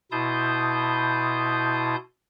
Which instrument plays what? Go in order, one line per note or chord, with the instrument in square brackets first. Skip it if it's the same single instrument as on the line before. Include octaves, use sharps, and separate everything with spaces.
[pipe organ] B2 E4 A5 C6 D#6 G6